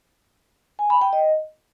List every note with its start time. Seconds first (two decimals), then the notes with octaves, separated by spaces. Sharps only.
0.79 G#5
0.90 B5
1.01 G5
1.13 D#5